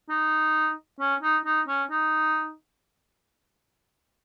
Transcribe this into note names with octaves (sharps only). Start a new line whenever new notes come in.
D#4
C#4
D#4
D#4
C#4
D#4